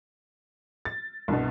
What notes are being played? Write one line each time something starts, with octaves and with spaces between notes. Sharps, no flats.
A6
C2 G2 B2